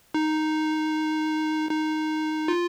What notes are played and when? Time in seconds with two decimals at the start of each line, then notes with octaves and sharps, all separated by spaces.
0.14 D#4
1.71 D#4
2.48 F4